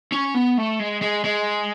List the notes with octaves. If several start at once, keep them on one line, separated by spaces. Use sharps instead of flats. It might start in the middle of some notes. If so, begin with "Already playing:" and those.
C#4
B3
A3
G#3
G#3
G#3